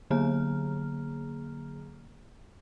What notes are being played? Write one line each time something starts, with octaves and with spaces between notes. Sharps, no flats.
D3 F#3 A#3 G#4 A#5 F6